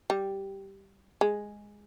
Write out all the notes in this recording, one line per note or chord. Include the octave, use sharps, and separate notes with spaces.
G3
G#3